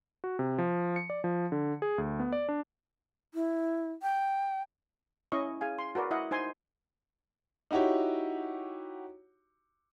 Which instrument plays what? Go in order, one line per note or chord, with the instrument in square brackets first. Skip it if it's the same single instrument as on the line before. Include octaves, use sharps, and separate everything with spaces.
[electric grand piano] F#4
C3
F3
C#7
D5
F3
D3
G#4
D2
B3
D5
D4
[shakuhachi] E4
G5
[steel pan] C#4 E4 D#5 C#6
G#4 F5 G#5
C6
F#4 A#4 B4 D5
E4 D#5 E5 F#5
D#4 C5 G#5 C6
[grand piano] D#4 E4 F#4 G4 C#5